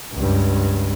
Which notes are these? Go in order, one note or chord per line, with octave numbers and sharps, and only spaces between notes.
C#2 G2